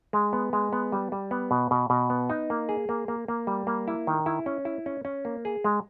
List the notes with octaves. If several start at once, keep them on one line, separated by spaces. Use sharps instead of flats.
G#3
B3
G#3
B3
G3
G3
B3
B2
B2
B2
B3
D#4
A#3
G#4
A#3
A#3
A#3
G3
A#3
E4
D#3
E4
C#4
E4
C#4
C#4
A#3
G#4
G#3